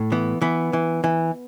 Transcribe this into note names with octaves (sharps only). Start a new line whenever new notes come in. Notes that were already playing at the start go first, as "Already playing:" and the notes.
Already playing: A2
E3 B3
E3 B3
E3
E3